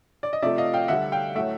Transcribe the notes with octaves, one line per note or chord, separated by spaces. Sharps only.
D5
D#5
C3 F3 A3 D5 E5
D#5 F5
F5 G5
D3 G3 E5 F#5
F5 G5
A2 F#3 A3 E5 F#5